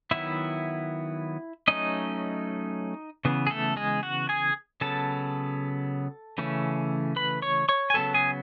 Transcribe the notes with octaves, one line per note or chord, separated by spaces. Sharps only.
D#3 F#3 B3 E4 E5
F#3 A3 C#4 D#4 D#5
C#3 E3 B3
G#4
A3 A4
G#3 G#4
F#4 F#5
G#4 G#5
C#3 F#3 B3 A4 A5
C#3 E3 A3 C#4
B4 B5
C#5 C#6
C#5 C#6
G#5
C#3 F#3 B3 A4 A5
G#4 G#5